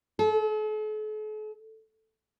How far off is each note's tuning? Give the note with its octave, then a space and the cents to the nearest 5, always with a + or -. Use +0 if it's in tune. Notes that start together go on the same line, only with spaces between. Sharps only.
A4 -45